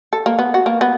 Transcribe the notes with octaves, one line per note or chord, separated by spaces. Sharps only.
A4
A#3
B3
F#4
A#3
B3